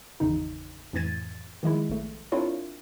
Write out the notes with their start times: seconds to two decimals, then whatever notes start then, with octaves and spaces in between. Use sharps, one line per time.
0.20 G#1 E2 C#3 D#4
0.93 F2 A2 E3 G#6 A6 D#7
1.63 D#3 F3 G#3 E4
1.90 A#1 A3
2.32 C4 D4 E4 F4 A#4 C#5